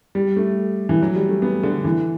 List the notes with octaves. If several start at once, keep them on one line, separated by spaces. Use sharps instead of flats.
G3
A3
E3
F#3
G3
A3
B3
D3
E3